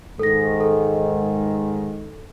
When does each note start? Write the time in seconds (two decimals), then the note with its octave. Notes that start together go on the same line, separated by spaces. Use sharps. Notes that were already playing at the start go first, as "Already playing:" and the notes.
0.19 G#2 D#3 A4 A#6
0.61 A4